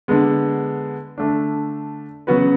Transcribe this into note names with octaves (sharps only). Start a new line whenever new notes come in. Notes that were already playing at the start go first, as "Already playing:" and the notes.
D3 G#3 B3
D3 A3 D4
C#3 F#3 B3 F#4 B4